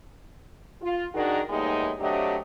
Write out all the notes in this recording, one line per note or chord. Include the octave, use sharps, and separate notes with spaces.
F4
D#3 D4 D#4 F#4 G#4 A#4
E2 A2 G3 G#3 A#3 D#4
F#3 A3 C4 D4 G4 D#5